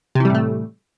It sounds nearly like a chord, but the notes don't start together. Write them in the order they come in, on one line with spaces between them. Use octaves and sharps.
C3 E3 G3 A2 A3